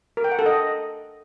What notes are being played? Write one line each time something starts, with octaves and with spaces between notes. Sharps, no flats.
A#4
G5
F#5
A4
D#5